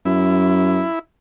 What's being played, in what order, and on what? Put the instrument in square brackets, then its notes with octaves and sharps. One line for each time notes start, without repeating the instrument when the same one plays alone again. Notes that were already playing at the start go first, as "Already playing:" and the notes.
[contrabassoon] F#2 [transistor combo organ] E4